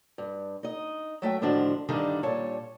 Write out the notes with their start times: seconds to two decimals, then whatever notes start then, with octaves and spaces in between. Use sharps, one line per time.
0.18 G2
0.63 D#4 D#5
1.22 F#3 A3 E5 G5
1.41 A2 D3 D#3 F3 D4 F#4
1.89 G2 D3 D#3 G3 D4
2.23 A#2 G3 C#5 A5